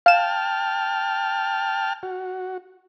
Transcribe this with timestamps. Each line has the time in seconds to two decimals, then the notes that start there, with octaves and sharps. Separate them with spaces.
0.06 F5 G5 A5 F6 E7
2.03 F#4